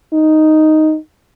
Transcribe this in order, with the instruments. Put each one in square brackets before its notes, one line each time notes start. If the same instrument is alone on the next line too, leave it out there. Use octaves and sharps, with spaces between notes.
[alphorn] D#4